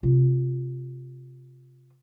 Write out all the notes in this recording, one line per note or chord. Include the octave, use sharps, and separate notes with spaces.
C3 F4